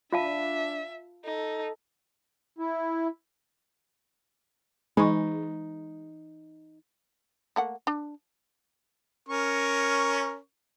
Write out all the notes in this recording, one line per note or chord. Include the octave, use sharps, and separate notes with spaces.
D4 F4 E5 F5 A5
D#4 A4
E4
E3 G#3 D#4 C#6
A3 A#3 F#5
D4
C#4 A#4 C#6